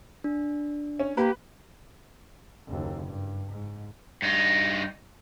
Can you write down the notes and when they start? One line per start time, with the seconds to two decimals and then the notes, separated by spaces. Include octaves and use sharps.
0.24 D4
0.99 C#4
1.17 A#3 G4 B4
2.67 F#1 D#2
3.06 G2
3.51 G#2
4.22 G2 D#4